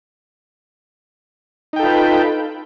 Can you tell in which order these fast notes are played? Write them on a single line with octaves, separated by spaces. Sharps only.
D#4 G5 A4 F4 B4